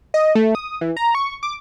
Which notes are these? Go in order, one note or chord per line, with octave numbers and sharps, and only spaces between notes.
D#5
A3
D#6
E3
A#5
C#6
D6